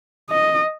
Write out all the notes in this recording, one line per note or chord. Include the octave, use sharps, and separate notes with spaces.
D#5